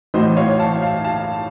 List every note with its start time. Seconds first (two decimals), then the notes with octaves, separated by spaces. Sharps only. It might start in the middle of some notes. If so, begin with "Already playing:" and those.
0.14 A1 A2 F#3 C5 D#5
0.37 C#5 F5
0.59 F5 A5
0.82 F5 A5
1.04 F5 A5